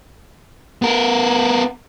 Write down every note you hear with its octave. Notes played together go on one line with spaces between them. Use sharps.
B3 A#4